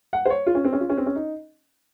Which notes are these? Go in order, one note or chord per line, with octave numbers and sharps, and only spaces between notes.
F#5
C5
C#5
F4
C#4
C4
C#4
F4
C#4
C4
C#4
D#4